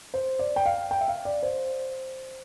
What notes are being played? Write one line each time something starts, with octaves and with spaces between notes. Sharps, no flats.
C5
D5
G5
F5
G5
E5
F5
D5
C5